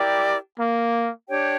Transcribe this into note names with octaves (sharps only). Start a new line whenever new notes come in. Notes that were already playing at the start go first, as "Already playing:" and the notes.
Already playing: E4 G4 A#4 D5
A#3
D4 G4 C#5 G5